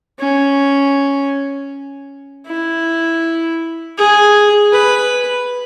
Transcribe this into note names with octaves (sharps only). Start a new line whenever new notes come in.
C#4
E4
G#4
B4